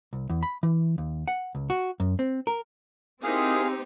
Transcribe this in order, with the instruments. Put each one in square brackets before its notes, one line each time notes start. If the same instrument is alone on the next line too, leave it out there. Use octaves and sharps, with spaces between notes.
[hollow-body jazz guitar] C2
E2
B5
E3
D#2
F#5
C#2
F#4
F#2
C4
A#4
[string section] C4 [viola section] D#4 G4 [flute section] E4 A#4 D#6 [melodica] G#4 F5